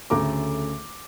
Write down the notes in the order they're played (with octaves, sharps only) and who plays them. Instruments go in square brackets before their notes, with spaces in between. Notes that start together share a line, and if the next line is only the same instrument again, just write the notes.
[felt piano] D2 C#3 A3 A#5 D6